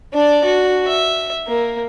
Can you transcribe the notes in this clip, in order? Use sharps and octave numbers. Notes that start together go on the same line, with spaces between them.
D4 D5
F#4
E5
A#3